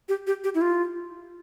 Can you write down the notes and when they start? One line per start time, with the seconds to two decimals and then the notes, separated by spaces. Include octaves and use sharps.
0.09 G4
0.27 G4
0.44 G4
0.55 E4
0.61 F4